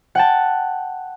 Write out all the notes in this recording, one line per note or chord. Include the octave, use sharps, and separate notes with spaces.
F#5 G5 A5